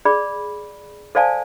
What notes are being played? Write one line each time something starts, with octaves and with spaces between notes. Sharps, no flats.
G#4 D5 B5
A4 C5 D5 F5 G#5 A5